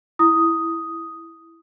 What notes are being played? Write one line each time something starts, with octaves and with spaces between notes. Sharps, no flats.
E4 D#6